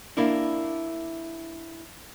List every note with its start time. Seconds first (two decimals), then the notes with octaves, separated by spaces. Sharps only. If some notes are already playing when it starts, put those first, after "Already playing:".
0.17 A#3 D4 E4